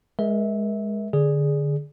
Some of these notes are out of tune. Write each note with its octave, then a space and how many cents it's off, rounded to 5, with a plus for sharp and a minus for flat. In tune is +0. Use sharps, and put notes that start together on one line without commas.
G#3 +0 A#4 +30 E5 -20
D3 +0 G#4 +0 D5 +0